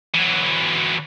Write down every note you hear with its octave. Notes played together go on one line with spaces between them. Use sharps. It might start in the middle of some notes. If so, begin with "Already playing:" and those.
E3 F#3